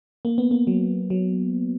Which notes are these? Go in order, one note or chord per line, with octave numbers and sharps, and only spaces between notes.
A#3
B3
A#3
F#3
F#3